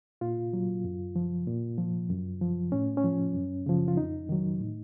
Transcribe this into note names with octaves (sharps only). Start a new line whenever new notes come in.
A#2 F4
F#3
F#2
F3
A#2
F3
F#2
F3
A2 C#4
C#4
F3
F#2
C#3 F3
F4
F2 D#4
D#3 F#3
A2